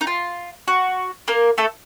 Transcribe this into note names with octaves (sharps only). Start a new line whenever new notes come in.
D#4
F4
F#4
A#3 A#4
A3 A4